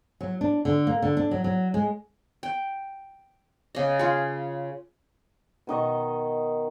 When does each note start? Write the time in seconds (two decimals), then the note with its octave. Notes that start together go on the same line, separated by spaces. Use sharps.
0.21 F#3
0.41 D4
0.65 D3
0.87 A#3
1.02 D3
1.17 D4
1.31 F#3
1.44 F#3
1.74 G#3
2.43 G5
3.75 C#3 D#5
3.99 F4 G#4
5.67 B2 D#3 D#5 C#6